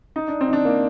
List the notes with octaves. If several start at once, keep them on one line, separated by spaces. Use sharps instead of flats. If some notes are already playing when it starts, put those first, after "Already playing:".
D#4
D4
C4
D#4
D4
A#3